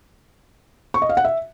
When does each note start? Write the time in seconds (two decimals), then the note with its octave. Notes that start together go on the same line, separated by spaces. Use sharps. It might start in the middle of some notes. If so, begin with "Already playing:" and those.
0.94 C#6
1.02 D#5
1.09 F5
1.17 F#5
1.25 E5